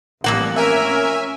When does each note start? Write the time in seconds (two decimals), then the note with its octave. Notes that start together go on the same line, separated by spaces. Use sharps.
0.24 A1 F2 G3 A#3 F#5
0.56 C#4 A#4 E5 G#5